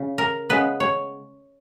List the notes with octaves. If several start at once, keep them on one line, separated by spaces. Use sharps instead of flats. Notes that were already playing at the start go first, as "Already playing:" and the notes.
Already playing: C#3
A#4
C#3 G#3 B3 B4
C#5